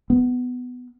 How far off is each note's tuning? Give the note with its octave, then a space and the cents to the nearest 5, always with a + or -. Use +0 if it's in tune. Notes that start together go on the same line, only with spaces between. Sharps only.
B3 +10